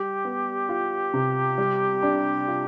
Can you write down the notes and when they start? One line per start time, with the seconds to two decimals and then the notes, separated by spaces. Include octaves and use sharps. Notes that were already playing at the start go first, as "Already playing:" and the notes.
Already playing: G3 G4
0.25 B3
0.69 F4
1.14 C3
1.58 G3
2.03 D4
2.48 F4